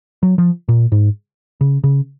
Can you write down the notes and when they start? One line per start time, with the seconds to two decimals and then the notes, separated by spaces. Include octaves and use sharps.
0.23 F#3
0.38 F3
0.69 A#2
0.92 G#2
1.61 C#3
1.84 C#3